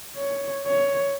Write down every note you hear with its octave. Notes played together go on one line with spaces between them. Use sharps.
C#5
C#5